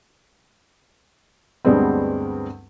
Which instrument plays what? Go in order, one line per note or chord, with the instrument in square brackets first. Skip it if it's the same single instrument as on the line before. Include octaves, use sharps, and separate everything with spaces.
[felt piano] D2 G2 G3 G#3 B3 C4